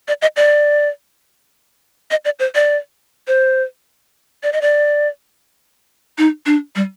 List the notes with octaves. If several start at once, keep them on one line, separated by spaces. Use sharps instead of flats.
D5
D#5
D5
D#5
D5
C5
D5
C5
D5
D#5
D5
D#4
D4
G3